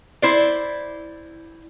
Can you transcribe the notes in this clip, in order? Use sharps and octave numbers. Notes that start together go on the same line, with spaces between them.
E4 C5 D5